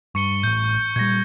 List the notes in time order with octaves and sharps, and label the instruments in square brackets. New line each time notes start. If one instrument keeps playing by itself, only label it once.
[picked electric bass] G2 [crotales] C#6 C#7 G7
[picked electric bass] A1 A2 [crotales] G6
[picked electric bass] A#2 G3 [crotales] G#6 A#6